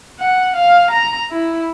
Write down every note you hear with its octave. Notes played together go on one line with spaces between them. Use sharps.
F#5
F5
A#5
E4